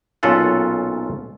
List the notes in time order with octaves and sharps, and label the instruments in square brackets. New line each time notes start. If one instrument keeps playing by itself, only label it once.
[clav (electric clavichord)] B1 A#2 C#4 F4 A4 F#5